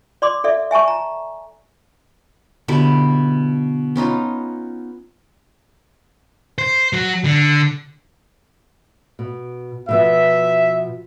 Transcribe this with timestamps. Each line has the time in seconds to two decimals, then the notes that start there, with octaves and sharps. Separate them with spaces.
0.22 D5 C6 D6
0.44 A4 D5 E5
0.71 E5 G#5 A5 C#6
0.88 A#5
2.68 B2 D3 E4 G4
3.96 B3 C#4 D#4 F4
6.58 C5
6.93 F#3 F#4
7.25 D3
9.19 B2
9.89 B2 F3 B3 E5